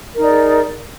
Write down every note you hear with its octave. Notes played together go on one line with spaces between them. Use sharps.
D#4 G#4 A#4 D5